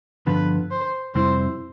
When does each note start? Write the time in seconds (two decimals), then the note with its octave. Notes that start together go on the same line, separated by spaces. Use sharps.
0.26 G2 D3 F3 B3 B4
0.71 C5
1.15 F2 C3 G3 C4 E4 C5